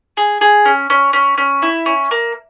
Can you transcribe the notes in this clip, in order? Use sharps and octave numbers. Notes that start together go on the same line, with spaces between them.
G#4
G#4
C#4
C#4
C#4
C#4
E4
C#4
A#3